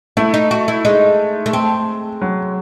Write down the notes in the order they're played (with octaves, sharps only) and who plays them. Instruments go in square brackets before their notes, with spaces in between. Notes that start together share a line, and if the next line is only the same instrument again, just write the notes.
[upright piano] A3 [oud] E4
[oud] D#4
F#4
E4
[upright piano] G#3 [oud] D#4
[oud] A3
C4
[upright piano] F#3